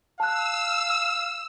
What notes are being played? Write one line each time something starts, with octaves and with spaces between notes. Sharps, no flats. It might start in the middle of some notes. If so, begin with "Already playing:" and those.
F5 A5 E6 F#6